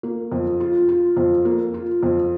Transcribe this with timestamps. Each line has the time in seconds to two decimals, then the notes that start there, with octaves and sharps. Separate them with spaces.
0.03 A#3
0.32 F2
0.60 F4
0.89 F4
1.17 F2
1.45 A#3
1.74 F4
2.03 F2